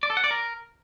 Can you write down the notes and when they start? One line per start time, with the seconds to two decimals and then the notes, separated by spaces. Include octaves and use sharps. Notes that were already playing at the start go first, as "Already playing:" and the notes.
0.03 D5
0.10 A4
0.17 F#5
0.24 D5
0.31 A#4